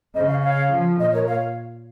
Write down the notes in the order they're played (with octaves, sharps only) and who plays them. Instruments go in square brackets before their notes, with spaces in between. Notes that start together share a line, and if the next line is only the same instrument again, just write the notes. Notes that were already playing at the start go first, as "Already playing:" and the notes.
[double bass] C#3 [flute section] C5 D#5
[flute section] C#5 F5
C#5 F5
[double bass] F3
[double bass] A#2 [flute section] C5 D#5
[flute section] A#4 C#5
C#5 F5